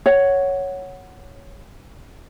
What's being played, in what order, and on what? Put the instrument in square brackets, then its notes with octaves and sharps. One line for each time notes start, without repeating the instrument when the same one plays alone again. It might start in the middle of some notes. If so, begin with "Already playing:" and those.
[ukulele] C#5 F#5